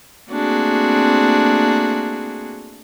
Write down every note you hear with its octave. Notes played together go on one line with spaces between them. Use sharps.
A3 A#3 C4 D4 F#4 G#4